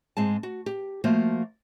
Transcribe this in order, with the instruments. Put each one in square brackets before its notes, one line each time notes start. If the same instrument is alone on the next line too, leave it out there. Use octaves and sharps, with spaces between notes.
[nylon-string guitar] G#2 G#3 C4 A5
F#4
G4
F3 A3 A#3 F#4 C5